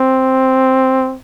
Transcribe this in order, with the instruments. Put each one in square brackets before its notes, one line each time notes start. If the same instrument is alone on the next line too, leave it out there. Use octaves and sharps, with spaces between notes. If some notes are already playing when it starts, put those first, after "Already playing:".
Already playing: [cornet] C4